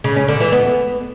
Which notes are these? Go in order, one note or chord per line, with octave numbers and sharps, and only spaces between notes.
C#3
C#4
D3
E3
B3